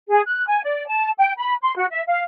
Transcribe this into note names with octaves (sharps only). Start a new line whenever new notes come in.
G#4
F#6
G#5
D5
A5
G5
B5
C6
F#4
E5
F5